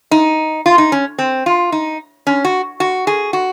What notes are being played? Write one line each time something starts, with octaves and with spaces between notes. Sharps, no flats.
D#4
F4
D#4
C#4
C4
F4
D#4
C#4
F#4
F#4
G#4
F#4